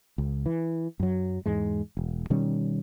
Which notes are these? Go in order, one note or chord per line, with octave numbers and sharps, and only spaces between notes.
C#2
E3
F#2 F#3
E2 G#2 G#3
E1
B2 D#3 G3 C#4